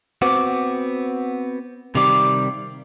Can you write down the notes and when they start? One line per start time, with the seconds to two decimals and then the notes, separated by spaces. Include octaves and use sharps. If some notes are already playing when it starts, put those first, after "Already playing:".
0.22 B3 C4 F#4 D6
1.95 C3 D#3 G3 F5 D6